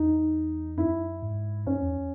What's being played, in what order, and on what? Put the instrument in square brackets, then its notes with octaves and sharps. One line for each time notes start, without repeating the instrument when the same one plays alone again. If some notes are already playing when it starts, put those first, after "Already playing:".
Already playing: [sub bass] E2 [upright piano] D#4
[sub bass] F#2 [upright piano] E4
[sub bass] G#2
[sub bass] F#2 [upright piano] C#4
[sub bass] E2